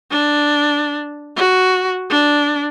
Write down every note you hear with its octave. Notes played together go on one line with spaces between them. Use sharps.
D4
F#4
D4